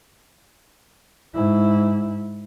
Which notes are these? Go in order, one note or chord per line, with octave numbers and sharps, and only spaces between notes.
G#2 E4